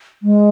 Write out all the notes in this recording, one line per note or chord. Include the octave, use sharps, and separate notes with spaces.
G#3